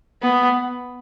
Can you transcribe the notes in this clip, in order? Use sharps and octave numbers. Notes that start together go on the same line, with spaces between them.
B3